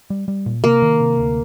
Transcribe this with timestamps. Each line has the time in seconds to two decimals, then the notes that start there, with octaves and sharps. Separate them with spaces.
0.10 G3
0.28 G3
0.46 A#2
0.64 C3 A#3
0.82 D#3
1.00 C3
1.18 D2